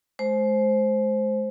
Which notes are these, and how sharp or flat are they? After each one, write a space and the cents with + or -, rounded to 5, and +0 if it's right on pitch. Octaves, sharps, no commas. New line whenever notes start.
G#3 +35 C5 +5